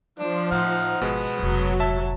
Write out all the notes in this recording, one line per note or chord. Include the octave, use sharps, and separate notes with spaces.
F3 D4
A2 D#4 F#5 F6
G#1 B2 G#3 B3
F1 G#2 F#3
E5 A5